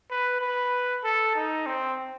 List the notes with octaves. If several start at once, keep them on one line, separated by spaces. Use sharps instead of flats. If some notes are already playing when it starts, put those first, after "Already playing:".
B4
B4
A4
D#4
C4